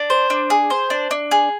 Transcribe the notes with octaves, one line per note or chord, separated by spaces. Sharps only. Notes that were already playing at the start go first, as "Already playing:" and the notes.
Already playing: D4
C5
D4
G#4
C5
D4
D4
G#4